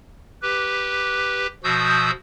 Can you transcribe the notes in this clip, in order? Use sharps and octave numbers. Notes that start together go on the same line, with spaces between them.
G4 B4
B2 F3 F#4 D#6 E6 G6